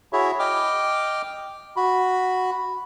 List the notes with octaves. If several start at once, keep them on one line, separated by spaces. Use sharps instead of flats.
E4 F#4 G#4 C#5 E5
D#5 G5 D6 F6
F#4 B5